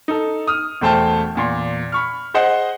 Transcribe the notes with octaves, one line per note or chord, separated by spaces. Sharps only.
D#4 A4
D#6 F6
E1 A3 C5 G5 A5 F6
E2 A#2 C6
B5 C#6 F6
G#4 C5 D#5 F#5